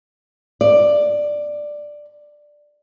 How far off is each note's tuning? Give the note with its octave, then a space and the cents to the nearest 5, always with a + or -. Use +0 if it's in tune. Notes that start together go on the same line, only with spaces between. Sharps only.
D5 +10